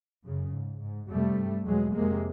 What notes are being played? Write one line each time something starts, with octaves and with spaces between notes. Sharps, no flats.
F#2 C#3
G#2
G#2
F2 C3 G3 A3
G2
E2 B2 F#3 G#3
F2 C3 G#3 A#3